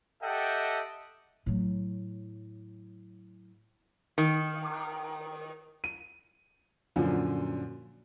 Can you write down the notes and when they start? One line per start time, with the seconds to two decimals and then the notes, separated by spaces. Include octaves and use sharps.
0.22 G4 A4 D#5 E5 F#5 G5
1.46 A2 F#3
4.18 D#3
5.84 D#7
6.96 F#2 A#2 D3 F3 F#3